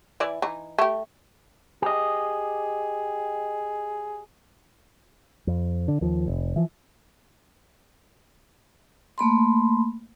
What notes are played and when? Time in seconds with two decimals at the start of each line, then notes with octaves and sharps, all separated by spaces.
0.20 E3 E4 D5
0.42 E3 D#4
0.78 A3 G4
1.82 G4 G#4 D#5
5.47 F2
5.88 D3
6.01 D#2 F3
6.28 F1
6.56 E3 F3
9.18 A3 A#3 B5 C6